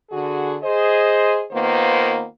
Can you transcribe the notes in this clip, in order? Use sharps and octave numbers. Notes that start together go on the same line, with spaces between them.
D3 F#4 G#4
G#4 C5 D#5
D#3 A#3 B3 F4 B4 C5